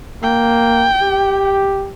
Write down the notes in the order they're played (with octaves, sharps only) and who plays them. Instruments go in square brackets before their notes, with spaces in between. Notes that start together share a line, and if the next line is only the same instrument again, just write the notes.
[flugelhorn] A#3 [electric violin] G5
[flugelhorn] G4